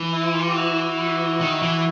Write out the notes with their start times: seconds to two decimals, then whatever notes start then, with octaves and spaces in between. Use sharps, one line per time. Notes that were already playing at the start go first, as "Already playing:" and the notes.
Already playing: E3
0.12 E4
0.34 F4
0.47 G4
0.55 E4 F#4
1.41 D#3
1.62 E3